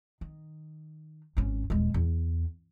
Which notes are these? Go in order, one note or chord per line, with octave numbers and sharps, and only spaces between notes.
D#3
G#1 C#4
D#1 G#3
E2